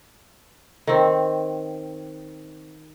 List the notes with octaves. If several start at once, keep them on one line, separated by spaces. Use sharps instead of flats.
D#3 C4